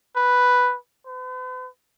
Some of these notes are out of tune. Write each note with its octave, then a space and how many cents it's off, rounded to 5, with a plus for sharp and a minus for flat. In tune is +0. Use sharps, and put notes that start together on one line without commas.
B4 +0
B4 +45